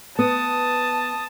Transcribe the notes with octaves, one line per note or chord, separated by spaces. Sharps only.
B3 A5 D#6